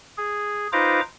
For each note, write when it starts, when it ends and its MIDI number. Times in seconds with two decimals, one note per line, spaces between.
0.18 0.67 68
0.73 1.01 63
0.73 1.01 65
0.73 1.01 71
0.73 1.01 72
0.73 1.01 82
0.73 1.01 86